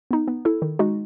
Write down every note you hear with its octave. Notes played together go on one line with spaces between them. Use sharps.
B3 D#4
B3
E4 A4
D#3
G#3 D#4 F#4